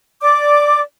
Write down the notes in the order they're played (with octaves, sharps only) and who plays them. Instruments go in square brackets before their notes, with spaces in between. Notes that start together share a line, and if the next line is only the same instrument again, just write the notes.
[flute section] D5 D6